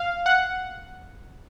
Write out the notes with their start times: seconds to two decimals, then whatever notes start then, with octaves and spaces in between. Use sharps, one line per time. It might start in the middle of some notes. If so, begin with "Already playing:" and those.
Already playing: F5
0.26 F#5